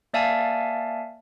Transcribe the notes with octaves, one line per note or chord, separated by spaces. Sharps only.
A#3 D5 E5 F5 G#5 A5